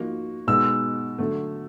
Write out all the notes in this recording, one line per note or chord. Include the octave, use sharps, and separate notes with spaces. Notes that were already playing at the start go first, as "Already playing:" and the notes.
Already playing: F3 A#3 D#4 F#4
B2 G#3 B3 D#4 E6
D3 F#3 A3